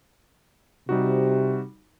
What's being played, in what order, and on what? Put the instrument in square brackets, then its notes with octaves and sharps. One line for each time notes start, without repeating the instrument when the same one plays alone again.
[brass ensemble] C3 [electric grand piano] G3 D#4 F#4